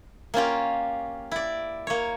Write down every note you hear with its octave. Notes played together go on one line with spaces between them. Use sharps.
A#3 C#4 F4 G4
E4 D5
A#3 C#5